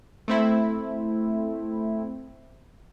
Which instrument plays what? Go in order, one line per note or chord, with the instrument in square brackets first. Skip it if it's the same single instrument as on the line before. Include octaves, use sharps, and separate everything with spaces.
[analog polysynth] A3 C4 E4